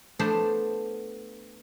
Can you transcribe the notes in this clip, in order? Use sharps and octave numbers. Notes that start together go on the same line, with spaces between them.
A3 B3 D4 C5